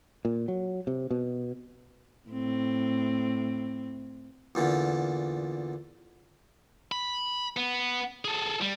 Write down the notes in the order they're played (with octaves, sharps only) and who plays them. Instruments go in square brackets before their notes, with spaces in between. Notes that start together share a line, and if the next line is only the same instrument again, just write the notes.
[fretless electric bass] A#2
F#3
C3
B2
[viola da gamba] A2 C4
[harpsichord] E2 A#2 D3
[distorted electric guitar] B5
B3
G#4 A4
G3